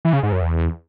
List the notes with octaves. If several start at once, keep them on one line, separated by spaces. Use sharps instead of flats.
E3
C#3
G#2
F#2
E2